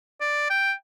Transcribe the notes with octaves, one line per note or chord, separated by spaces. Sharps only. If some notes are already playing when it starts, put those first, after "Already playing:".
D5
G5